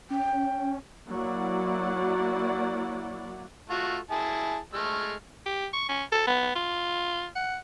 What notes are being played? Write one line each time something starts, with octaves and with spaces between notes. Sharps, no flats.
C#4 G5
F#3 A#3 E4 D5 F#5
A3 F4 F#4
E4 G#4 A5
G#3 A3 F6
G4
C#6
C#4
A4
B3
F4
F#5